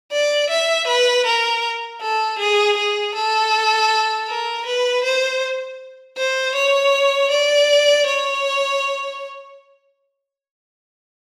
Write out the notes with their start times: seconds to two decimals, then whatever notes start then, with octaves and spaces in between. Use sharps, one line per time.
0.12 D5
0.50 E5
0.87 B4
1.26 A#4
2.02 A4
2.39 G#4
2.77 G#4
3.15 A4
4.29 A#4
4.66 B4
5.04 C5
6.17 C5
6.55 C#5
7.31 D5
8.07 C#5